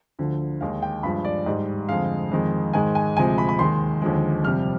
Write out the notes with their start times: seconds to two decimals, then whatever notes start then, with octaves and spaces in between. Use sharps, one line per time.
0.19 D2 D3 F3
0.61 D#2 D#3 G#3 F5
0.82 G5
1.03 G2 F3 G#3 B5
1.25 D5
1.46 G#2 G3 D#5
1.89 F2 D3 G#3 F5
2.32 F2 D#3 G#3
2.73 G#2 D#3 G#3 G#5
2.95 G#5
3.16 D2 C3 F3 G#3 G#5
3.38 B5
3.49 B5
3.59 D#2 D#3 G#3 C6
4.02 D#2 D3 F3 G#3
4.44 F2 C3 G3 F6